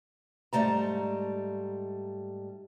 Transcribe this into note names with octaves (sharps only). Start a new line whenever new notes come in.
G#2 G3 A3 A5 A#5